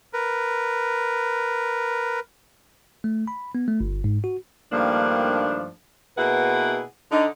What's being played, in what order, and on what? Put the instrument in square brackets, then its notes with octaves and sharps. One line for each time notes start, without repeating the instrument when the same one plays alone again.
[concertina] A#4 B4
[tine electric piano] A3
B5
B3
A3
G1
G#2
F#4
[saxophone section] G2 D#3 F3 A3 A#3 D4
B2 A#3 E4 G#4 B4 F#5
D3 D#4